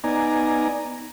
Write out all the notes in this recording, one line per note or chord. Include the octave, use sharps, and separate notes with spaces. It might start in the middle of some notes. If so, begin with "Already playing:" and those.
B3 D#4 D5 G#5 A#5